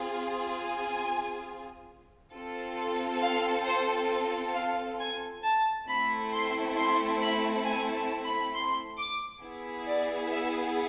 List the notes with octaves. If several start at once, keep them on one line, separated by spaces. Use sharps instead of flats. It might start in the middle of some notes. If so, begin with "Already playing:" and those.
Already playing: C4 F4 G#4
G#5
C4 F4 A4
F5
C5
F5
G#5
A5
A3 C4 E4 B5
C6
C6
B5
G#5
A5
B5
C6
D6
B3 E4 G#4
D5
E5